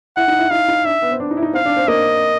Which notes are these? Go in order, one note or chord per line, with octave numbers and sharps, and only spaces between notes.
E4 F#5
D#4
E4
D#4 F5
D#4
D4 E5
B3
C4
D4
D#4
E4
D#4
C4 F5
D4
C4
A#3 D#5